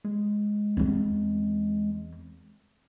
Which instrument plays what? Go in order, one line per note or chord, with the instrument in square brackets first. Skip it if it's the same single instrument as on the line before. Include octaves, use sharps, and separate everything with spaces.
[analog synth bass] G#3
[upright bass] E2 C4